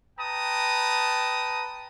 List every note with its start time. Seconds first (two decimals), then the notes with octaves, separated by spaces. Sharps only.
0.19 B4 G5 A5 A#5 D#6